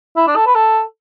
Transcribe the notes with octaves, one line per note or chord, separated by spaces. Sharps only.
E4
D4
A4
B4
A4